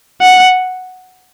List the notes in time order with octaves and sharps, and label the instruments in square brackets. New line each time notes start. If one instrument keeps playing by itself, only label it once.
[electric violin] F#5